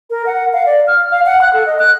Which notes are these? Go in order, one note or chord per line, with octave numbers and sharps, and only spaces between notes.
A#4
F#5
F5
D5
F6
F5
F#5
F#6
A4
D#5
F#6